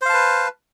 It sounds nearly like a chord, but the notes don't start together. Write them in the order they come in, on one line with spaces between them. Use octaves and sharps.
C5 F5 A5 B4